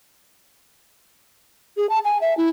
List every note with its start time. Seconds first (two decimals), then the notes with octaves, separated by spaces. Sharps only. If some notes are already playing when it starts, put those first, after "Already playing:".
1.77 G#4
1.89 A5
2.04 G#5
2.21 E5
2.37 E4